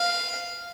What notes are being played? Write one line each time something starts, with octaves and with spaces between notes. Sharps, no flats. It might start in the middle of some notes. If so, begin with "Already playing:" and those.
Already playing: F5